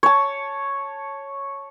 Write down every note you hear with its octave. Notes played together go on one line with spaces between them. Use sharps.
C#5 A5